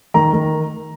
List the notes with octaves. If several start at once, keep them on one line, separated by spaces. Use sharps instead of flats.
D#3 A#5
D#3